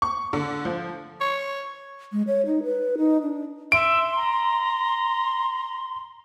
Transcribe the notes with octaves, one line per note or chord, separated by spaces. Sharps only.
C#6
D3
F3
C#5
G#3
C#5
D#4
B4
D#4
D4
E5 C6 D7
A#5